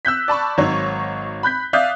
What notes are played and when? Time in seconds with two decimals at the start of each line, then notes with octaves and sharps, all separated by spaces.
0.05 E6 F#6 G6 B6
0.28 D5 A5 B5 C#6
0.57 G#1 F#3 D#4 C#5
1.43 B5 F#6 G6 B6
1.73 D5 E5 F5 D#6 F#6 G6